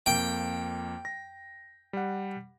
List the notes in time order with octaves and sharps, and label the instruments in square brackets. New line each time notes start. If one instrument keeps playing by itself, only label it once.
[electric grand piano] F2 A#3 [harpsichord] G5
[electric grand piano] A#6
G3 F#5